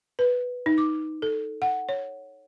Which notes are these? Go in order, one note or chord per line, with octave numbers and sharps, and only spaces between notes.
B4
D#4
D6
A4
F#5
C#5